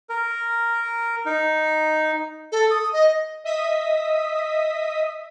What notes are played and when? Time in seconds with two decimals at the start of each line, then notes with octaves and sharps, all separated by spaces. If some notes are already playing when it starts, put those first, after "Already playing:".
0.10 A#4
1.26 D#4
2.52 A4
2.70 D#6
2.93 D#5
3.44 D#5 E5 D#6 B6